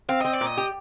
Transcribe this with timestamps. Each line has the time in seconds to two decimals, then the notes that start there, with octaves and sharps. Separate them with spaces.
0.09 C4 F5
0.21 C4 D#5
0.34 D5
0.41 A#2
0.47 D#5
0.57 G4